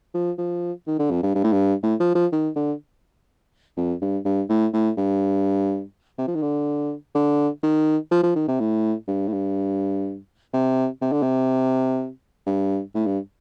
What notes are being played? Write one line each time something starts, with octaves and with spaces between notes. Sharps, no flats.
F3
F3
D#3
D3
F2
G2
G2
A2
G2
A2
F3
F3
D#3
D3
F2
G2
G2
A2
A2
G2
C3
F3
D#3
D3
D3
D#3
F3
F3
D#3
C3
A2
G2
A2
G2
C3
C3
D3
C3
G2
A2
G2